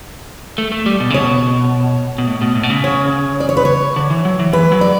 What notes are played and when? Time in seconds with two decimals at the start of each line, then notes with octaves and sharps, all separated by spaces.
0.58 A3
0.72 A3
0.86 G3
1.00 B2
1.10 C#3
1.14 B2 C#5
2.18 B2
2.27 A2
2.42 B2
2.55 A2
2.63 B2
2.69 C#3
2.84 C#5
3.40 D5
3.49 C#5
3.57 B4
3.65 C#5
3.96 D3
4.10 E3
4.25 F#3
4.39 E3
4.53 E3 B4
4.72 F#3
4.81 D5